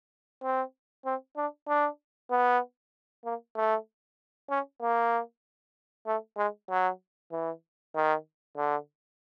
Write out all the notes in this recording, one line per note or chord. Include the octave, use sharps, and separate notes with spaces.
C4
C4
D4
D4
B3
A#3
A3
C#4
A#3
A3
G#3
F#3
E3
D#3
D3